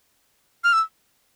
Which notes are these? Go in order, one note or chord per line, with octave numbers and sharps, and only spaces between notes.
F6
E6